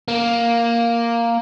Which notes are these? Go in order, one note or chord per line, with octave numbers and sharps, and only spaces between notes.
A#3